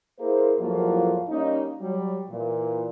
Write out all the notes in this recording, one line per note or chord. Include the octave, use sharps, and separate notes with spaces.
A#3 E4 G#4 A#4 C5
E2 A2 F3 F#3 A#3 F4
G3 A#3 C#4 D#4
F#3 G3
A#2 E3